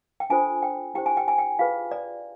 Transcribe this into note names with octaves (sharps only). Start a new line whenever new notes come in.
G5
D4 F4 A4 C5 G#5
G5
E4 G4 C5 G5
G#5
G5
G#5
G5
F4 G#4 B4 F5
D5